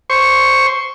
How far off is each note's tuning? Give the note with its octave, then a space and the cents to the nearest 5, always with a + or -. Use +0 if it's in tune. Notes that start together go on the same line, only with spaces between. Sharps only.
C5 +0 C#6 +0